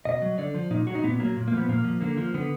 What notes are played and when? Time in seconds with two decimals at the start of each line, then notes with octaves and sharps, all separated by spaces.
0.05 B2 D#5
0.22 F#3
0.38 D3 D5
0.54 F3
0.70 A#2 D#4
0.87 F#3 F#4
0.95 D#4
1.04 A#2 B3
1.20 F#3 A#3
1.37 A#2
1.48 A#3
1.53 F3 B3
1.68 A#2 A#3
1.84 F3
2.01 D3 A#3
2.17 F3
2.34 D3 B3